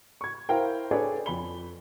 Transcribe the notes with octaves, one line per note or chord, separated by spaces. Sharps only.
C#6 G#6
E4 A#4 C5 F5 G5
D4 G#4 A4 B4 C#5 D5
F2 B5 G7